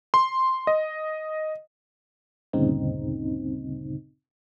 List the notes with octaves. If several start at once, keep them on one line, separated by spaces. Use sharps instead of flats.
C6
D#5
D2 G2 A#2 C#3 C4 D#4